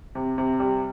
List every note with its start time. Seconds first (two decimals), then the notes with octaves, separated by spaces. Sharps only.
0.15 C3
0.38 C3
0.60 G3